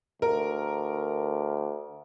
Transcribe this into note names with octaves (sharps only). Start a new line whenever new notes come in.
D2 A#4